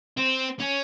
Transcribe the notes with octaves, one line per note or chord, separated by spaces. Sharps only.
C4
C#4